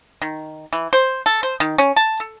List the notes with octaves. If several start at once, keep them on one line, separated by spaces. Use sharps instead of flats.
D#3
E3
C5
A4
C5
D#3
C#4
A5
A4